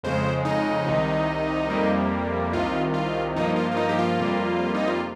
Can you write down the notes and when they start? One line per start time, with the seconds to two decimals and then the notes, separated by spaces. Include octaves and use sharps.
0.03 F2 C#3 G#3 C5
0.45 D#4
0.87 C2 C3 D#3
1.70 F2 C3 G3 A#3
2.53 C2 C3 D#3 F4
2.94 F4
3.36 G2 F3 A#3 D#4
3.56 F4
3.71 F4
3.77 D#4
3.89 G4
3.99 F4
4.18 F2 C3 G3 A#3
4.75 D#4
4.88 F4